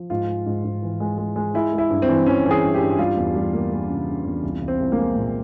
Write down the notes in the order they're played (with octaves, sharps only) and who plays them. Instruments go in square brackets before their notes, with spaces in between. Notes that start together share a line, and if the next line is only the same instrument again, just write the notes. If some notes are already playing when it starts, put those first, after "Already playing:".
Already playing: [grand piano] F3
G#2 F4
G#3
G#2
G#2
E3
G#3
G#3
G#3
G#3 E4
G#3
E4
G2
C4
E3
E3 C#4
E3
G#4
G2
G4
G2
G3 F4
E2
G3
A#3
A#3
C#3
C#3
E2
C2
C2
C4
C2
A#3
G#3
A#2